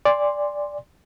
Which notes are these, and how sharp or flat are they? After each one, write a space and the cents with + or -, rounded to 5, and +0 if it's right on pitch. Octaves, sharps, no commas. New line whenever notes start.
D5 +0 G#5 -40 C6 +0